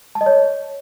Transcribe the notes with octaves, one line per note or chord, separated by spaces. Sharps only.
A5
D#5
C#5